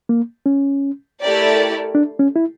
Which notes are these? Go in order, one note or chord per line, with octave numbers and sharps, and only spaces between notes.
A#3
C#4
A3 E4 G4 A#4 D5
D4
C#4
E4